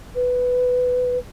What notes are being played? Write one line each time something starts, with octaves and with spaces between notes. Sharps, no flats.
B4